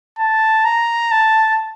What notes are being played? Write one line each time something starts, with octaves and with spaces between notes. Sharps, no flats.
A5
A#5
A5